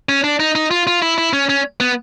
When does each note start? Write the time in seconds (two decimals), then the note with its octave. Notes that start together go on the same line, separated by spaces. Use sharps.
0.09 C#4
0.24 D4
0.40 D#4
0.55 D#4
0.71 F4
0.87 F4
1.02 E4
1.18 E4
1.33 C#4
1.49 C#4
1.80 B3